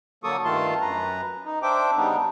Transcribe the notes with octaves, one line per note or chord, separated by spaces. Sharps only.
D3 F#3 A#3 A4 C#6 D#6
G2 D#3 A3 F4 A5 C6
F#2 B4 A#5
D#4
D4 C5 E5 G5 D6
C#3 G3 B3 D4 D#4